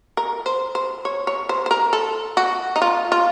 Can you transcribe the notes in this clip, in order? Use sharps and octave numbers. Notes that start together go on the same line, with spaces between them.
A#4
C5
C5
C#5
C#5
C5
C5
A#4
A4
F#4
D#4
F4
F4